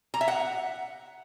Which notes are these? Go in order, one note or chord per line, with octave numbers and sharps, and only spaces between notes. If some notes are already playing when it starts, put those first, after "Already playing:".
A#5
E5
F#5